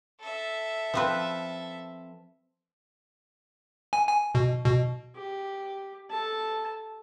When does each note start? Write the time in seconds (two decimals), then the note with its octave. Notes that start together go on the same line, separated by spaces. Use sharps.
0.21 A4 E5
0.94 F3 C4 B4
3.93 G#5
4.08 G#5
4.35 B2
4.65 B2
5.16 G4
6.11 A4 A5